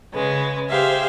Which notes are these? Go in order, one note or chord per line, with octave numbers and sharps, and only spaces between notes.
C#3 G#3 B4
G4 G#4 C5 E5 F5